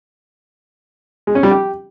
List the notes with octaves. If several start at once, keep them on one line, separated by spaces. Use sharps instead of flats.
G#3
C#4
G3
G4